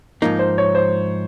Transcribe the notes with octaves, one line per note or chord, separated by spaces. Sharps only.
G#2 F3 A#3 D#4
C5
C#5
C5